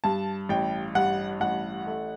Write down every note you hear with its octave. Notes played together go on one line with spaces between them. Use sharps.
G2 A5
A1 G5
G2 F#5
A1 F#5
A3